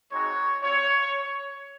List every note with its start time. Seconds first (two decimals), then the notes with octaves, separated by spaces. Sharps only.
0.12 G#3 C4 D#4 F#4 C#5
0.62 C4 F4 C#5